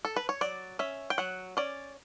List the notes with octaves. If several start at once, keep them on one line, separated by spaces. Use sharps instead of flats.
A4
B4
C#5
F#3 D5
C#4 E5
G5
F#3 F#5
C#4 D5